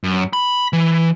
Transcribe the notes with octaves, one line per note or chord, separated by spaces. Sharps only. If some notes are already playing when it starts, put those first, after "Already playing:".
F#2
B5
E3